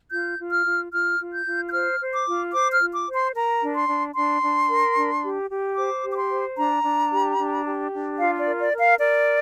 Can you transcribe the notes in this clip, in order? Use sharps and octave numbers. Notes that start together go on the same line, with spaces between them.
F4 G6
F4
F6
F4
F4 F6
F4
G6
F4
G6
C5 F6
C5
D6
F4
C5 D6
F6
F4
D6
C5
C6
A#4 A#5
D4
C6
D4
D4 C6
D4
A#4
D4
G4
G4
C5 D6
G4
D6
C6
C5
D4 A#5
D4
G4
D4
G4
D4
F4 F5
D5
A#4
D5
A#4
F5
A#4 D5